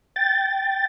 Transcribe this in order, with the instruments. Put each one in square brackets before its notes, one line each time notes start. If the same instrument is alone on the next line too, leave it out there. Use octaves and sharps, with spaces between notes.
[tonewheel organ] G5 A6